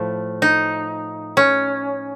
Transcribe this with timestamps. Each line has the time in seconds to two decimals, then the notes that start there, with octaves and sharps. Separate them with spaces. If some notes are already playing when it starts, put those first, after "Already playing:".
Already playing: A2 F3 A3
0.42 D#4
1.37 C#4